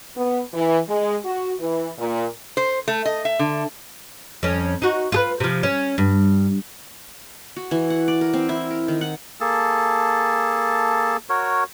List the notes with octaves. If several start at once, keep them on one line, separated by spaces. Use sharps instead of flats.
B3
E3
G#3
F#4
E3
A#2
C5
A3
D#5
E5
D3
F2 C#4
D#4 F#4
F4 G#4 B4
C3 F3
C#4
G2
F#4
E3
F#5
D5
A#4
C4
E4
A#4
D#3
F#5
A#3 G#4 A4 A5
F#4 A#4 C#5